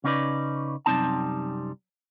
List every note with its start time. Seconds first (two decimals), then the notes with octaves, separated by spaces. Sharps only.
0.04 C#3 C#4 D#4 G#4 B4 D5
0.86 F#2 C3 G3 C4 D#4 A5